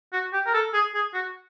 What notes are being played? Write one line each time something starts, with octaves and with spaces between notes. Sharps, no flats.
F#4
G4
A#4
A4
G#4
G#4
F#4